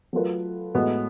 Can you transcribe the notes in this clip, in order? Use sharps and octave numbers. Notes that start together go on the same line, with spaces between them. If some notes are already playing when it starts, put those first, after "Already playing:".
F#3 A3 F4 B4
A2 G#3 B3 F#4